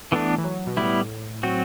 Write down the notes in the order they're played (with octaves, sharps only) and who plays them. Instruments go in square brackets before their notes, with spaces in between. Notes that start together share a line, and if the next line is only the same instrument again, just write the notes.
[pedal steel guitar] E3 B3 D4 [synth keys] A3
[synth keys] E3
F#3
B2
[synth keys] A2 [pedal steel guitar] G3 B3 E4
[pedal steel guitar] F#3 C4 F#4